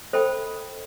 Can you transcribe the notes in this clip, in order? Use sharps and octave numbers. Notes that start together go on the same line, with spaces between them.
A4 C5 D#5 G5 B5